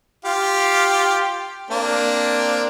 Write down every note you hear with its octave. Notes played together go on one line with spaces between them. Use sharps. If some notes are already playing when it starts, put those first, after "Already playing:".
F4 G4 F5
A#3 C4 D4